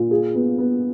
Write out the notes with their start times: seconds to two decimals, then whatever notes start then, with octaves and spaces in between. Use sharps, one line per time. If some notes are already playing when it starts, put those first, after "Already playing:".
Already playing: A#2 F4
0.11 G#4
0.35 B3
0.58 B3